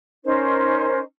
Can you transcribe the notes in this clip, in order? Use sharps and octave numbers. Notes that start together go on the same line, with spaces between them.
C#4 D#4 A#4 C5